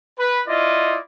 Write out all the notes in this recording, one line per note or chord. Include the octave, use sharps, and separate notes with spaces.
B4
E4 F4 D5 D#5